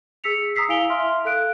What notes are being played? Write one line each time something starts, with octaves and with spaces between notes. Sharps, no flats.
G#4 E6 B6 C#7 F7
A#5 D#6 E6 B6 C7
E4 F5 G#5 D7 F7 G7
E5 C6 F6
A4 F5 F#6 D7